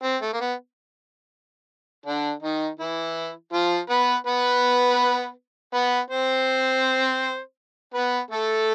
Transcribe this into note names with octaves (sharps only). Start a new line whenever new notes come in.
C4
A3
A#3
B3
D3 D4
D#3 D#4
E3 E4
F3 F4
B3 B4
B3 B4
B3 B4
C4 C5
B3 B4
A3 A4